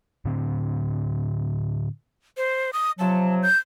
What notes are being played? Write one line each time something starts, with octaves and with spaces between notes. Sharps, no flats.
A2 D3 C4
C5
D#6
C3 F3 F#3 A5
G6